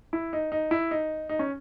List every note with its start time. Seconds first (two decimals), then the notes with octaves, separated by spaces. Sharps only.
0.13 E4
0.33 D#4
0.52 D#4
0.71 E4
0.91 D#4
1.29 D#4
1.39 C#4